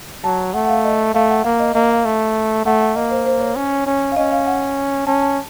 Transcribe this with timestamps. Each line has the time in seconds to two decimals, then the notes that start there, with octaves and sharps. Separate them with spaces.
0.24 F#3 A5
0.54 A3 F#5
0.65 F#5
0.69 F5
0.85 D#5
1.14 A3 F5
1.30 F#5
1.44 A#3 F5
1.60 D#5
1.75 A#3 D#5
1.91 F5
2.05 A3
2.65 A3 F#5
2.81 F#5
2.96 A#3 D#5
3.11 C5
3.26 C5
3.41 C#5
3.56 C#4 C#5
3.86 C#4
4.12 F5
4.16 C#4 D#5
4.32 F5
4.47 F#5
5.07 C#4 A5
5.22 A5